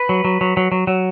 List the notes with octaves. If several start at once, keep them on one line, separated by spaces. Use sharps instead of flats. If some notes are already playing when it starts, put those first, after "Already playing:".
Already playing: B4
F#3
F#3
F#3
F#3
F#3
F#3